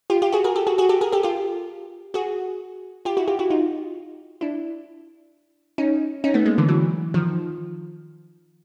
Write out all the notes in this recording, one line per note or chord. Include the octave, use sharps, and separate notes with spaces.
F4 G4
F4 G4
F#4 G#4
G#4 A#4
G4 A4
F#4 G#4
F#4 G#4
G4 A4
G#4 A#4
G4 A4
F4 G4
F#4 G#4
F4 G4
E4 F#4
F4 G4
E4 F#4
D#4 F4
D4 E4
C#4 D#4
C#4 D#4
A3 B3
G#3 A#3
D3 E3
E3 F#3
D#3 F3